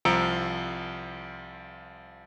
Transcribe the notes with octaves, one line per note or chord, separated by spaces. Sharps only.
C2 F3 A#5 E6 C#7 D7